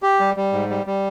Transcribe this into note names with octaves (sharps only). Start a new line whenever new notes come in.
G4
G3
G3
G#2
G3
G3